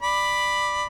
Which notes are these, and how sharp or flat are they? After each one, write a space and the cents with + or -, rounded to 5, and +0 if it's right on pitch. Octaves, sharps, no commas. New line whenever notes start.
D5 +10 B5 +0